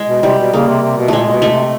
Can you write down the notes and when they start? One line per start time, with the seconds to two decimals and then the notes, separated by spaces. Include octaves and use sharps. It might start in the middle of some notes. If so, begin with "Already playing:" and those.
Already playing: G#3
0.09 B2
0.23 C3 G3
0.38 B2
0.52 C#3 A#3
0.68 C3
0.83 C3
0.97 B2
1.08 A#2 G#3 A3
1.28 A#2
1.32 B2
1.42 A3
1.52 C3